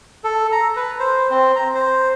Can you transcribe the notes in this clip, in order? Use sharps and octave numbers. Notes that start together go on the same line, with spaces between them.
A4
A#5
B4
C5
C4
A#5
C5